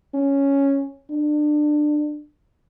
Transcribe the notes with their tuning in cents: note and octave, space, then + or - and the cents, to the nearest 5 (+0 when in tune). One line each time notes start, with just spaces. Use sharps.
C#4 +0
D4 +25